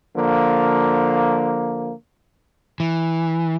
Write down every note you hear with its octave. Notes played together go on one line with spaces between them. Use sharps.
D3 F3 A#3
E3